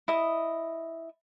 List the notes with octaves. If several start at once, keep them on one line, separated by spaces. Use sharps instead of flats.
E4 D#5